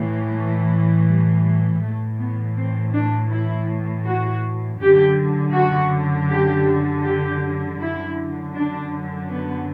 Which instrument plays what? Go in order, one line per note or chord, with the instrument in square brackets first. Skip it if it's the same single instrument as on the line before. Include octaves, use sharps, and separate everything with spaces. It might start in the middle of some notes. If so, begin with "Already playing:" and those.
Already playing: [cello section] A2 E3
A3
G3
A2 E3 A3
B3
C4
D4
E4
F#4
F#2 D3 G4
F#4
G4
G4
F#2 D3 E4
D4
B3